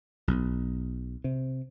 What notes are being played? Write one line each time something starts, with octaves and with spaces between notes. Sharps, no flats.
B1
C3